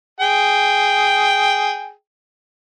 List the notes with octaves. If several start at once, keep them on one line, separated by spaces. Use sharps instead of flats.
G#4 G5